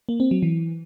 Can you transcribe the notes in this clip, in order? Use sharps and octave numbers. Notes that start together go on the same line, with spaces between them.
A#3
C4
F#3
E3